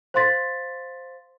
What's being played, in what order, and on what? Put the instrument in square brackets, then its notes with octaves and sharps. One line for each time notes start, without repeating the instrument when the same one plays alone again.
[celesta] C5 F5 C6 A6 B6